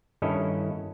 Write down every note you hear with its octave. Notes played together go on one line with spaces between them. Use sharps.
G2 D#3 C#4 E4 A4 D#5